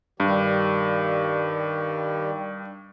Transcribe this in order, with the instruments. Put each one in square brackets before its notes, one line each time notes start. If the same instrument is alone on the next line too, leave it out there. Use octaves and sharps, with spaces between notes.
[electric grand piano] G2 [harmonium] D#3 G3 G4